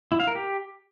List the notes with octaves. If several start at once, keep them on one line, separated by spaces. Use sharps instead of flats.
E4
F5
A#4
G4